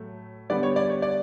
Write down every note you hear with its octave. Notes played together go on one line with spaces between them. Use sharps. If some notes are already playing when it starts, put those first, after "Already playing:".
Already playing: A2 F#3 A3
D3 G3 B3 D5
C#5
D5
C#5
D5